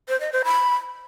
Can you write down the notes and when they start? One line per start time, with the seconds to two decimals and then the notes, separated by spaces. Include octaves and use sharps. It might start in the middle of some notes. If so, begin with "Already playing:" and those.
0.09 C5
0.21 D#5
0.33 C5
0.45 B5